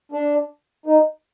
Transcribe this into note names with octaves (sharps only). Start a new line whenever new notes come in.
D4
D#4